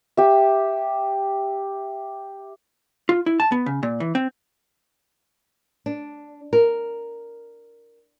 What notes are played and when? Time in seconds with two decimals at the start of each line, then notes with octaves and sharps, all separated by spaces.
0.17 G4 E5
3.09 F4
3.26 E4
3.40 A5
3.52 B3
3.66 C#3
3.83 A#2
4.00 E3
4.15 C4
5.86 D4
6.53 A#4